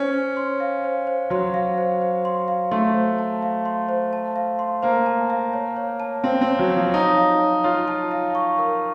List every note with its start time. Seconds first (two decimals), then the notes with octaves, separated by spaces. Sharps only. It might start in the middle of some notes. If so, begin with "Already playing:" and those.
Already playing: C#4 C5
0.13 C5
0.37 C6
0.60 F5
0.84 C5
1.07 C5
1.30 F#3 C6
1.54 F5
1.78 C5
2.01 C5
2.25 C6
2.48 F5
2.71 A3 C6
2.94 C5
3.18 A5
3.42 F5
3.65 C6
3.89 C5
4.13 A5
4.36 F5
4.59 C6
4.83 A#3 C5
5.06 A5
5.30 F5
5.53 C#5
5.76 C#5
6.00 A5
6.23 C4 F5
6.41 C4
6.47 C#5
6.59 F#3
6.70 C#5
6.76 F3
6.94 D#4 A5
7.17 F5
7.41 C#5
7.64 F4 C#5
7.88 A5
8.11 F5
8.35 C#6
8.58 A#4